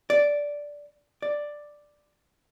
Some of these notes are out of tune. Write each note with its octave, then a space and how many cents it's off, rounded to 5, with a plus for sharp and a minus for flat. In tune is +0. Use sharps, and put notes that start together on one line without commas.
D5 -5
D5 +5